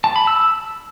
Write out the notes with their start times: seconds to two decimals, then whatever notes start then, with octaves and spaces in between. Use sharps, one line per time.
0.04 A5
0.16 B5
0.27 E6